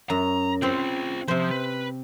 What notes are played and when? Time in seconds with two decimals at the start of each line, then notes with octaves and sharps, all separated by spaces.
0.10 F#2 A#5
0.62 C4 F4 G#4 G5
1.28 C3 F3 C5
1.51 B4